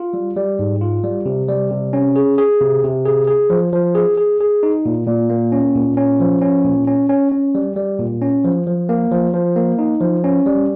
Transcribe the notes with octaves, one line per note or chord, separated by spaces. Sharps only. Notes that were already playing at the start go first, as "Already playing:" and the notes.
Already playing: F4
G3
G3
G#2
F4
G3
C3
G3
C3
C#4
G#4
G#4
C3
C3
G#4
G#4
F3
F3
G#4
G#4
G#4
D#4
A#2
A#2
A#3
C#4
A#2
C#4
F3
C#4
A#2
C#4
C#4
C#4
G3
G3
A#2
C#4
F3
F3
A#3
F3
F3
A#3
D#4
F3
C#4
G3